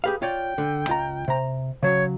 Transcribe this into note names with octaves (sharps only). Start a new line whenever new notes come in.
G4 G#4 B4 F5
F4 C#5 D5 G5
D3
C#2 F4 A#5
C3 A#5
C#3 F#3 C#5